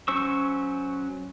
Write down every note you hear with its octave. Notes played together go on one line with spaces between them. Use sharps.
F#3 C#4 C5 C#6 E6